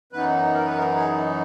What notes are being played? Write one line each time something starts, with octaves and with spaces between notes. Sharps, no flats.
F#2 E3 B3 D#4 B4
A#4
B4
A#4
G#4